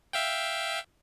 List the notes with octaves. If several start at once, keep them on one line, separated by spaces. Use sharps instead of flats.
E5 F5 G5